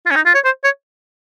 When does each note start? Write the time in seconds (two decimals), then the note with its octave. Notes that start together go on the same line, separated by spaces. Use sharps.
0.06 F4
0.11 C#4
0.15 D#4
0.25 F4
0.34 C#5
0.44 C5
0.64 C#5